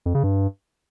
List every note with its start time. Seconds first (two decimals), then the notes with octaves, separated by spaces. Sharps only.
0.06 F2
0.15 C#3
0.23 G2